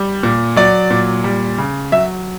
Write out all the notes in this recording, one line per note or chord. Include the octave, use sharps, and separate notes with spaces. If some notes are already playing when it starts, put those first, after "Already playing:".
Already playing: G3
A#2
F#3 D5
A#2
G3
C#3
F#3 E5